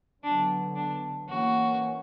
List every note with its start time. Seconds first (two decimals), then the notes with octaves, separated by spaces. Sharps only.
0.23 D3 F#3 B3 D4
0.76 D4
1.28 E3 A#3 C#4 F#4